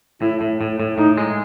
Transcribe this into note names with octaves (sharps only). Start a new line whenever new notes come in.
A2 E4
A2
A2
A2
A2 D#4
G#3